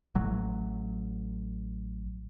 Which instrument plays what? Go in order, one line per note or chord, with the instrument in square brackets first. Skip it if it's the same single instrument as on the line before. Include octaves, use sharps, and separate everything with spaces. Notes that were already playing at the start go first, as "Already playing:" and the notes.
[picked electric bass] A1 F#3